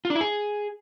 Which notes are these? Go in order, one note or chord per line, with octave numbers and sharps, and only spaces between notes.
F4
D4
E4
G#4